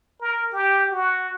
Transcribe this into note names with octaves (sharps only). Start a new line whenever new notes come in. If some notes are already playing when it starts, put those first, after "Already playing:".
A#4
G4
F#4